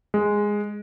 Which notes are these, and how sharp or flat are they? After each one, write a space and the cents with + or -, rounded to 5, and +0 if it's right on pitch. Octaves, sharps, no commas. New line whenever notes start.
G#3 -5